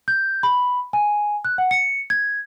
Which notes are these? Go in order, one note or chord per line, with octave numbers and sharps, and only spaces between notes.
G6
B5
G#5
F#6
F#5
C#7
G#6